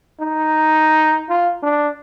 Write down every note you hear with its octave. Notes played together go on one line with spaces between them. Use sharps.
D#4
F4
D4